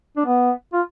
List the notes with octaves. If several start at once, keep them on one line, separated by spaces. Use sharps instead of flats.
D4
B3
F4